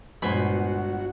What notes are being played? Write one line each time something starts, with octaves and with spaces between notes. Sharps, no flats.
G1 A#2 G#3 B3 F#4 C5 G#5 B5